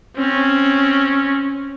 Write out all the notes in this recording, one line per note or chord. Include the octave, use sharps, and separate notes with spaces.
C4 C#4